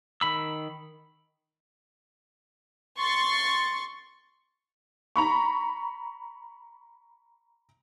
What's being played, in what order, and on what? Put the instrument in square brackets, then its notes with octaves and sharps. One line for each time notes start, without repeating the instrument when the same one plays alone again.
[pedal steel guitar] D#3 B5 E6
[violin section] C6 C#6 A6
[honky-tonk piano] A#5 B5 C#6